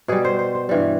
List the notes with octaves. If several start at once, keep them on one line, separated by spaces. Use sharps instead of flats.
B2 G3 G#4
C5
C5
C5
G2 E3 G3